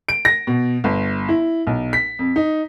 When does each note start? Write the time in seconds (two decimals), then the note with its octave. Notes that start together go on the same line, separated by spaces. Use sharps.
0.09 D7
0.25 A#6
0.47 B2
0.84 G1
1.29 E4
1.67 B1
1.93 B6
2.19 F2
2.36 D#4